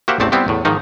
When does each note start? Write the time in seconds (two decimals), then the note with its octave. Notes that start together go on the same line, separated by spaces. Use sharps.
0.08 A#3 F#4 G4 C5 E5 F#5
0.20 A1 E2 A3 C4 D5 A5
0.32 G3 B3 C4 E4 F4 G4
0.48 E2 A2
0.65 G#2 D#3 F3 D#4